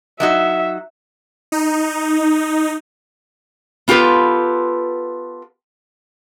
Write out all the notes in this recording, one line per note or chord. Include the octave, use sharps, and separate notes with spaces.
F#3 D#4 F#4 E5
D#4
B3 F4 G4 A4 B4